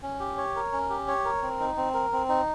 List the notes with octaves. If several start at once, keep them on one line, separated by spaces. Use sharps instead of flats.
C#4
G4
C#5
A#4
C#4
G4
C#5
A#4
C4
D#4
C4
A#4
C4
D#4